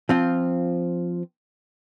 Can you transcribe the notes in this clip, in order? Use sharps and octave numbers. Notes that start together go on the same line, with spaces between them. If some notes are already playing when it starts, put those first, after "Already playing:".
F3 C4 F4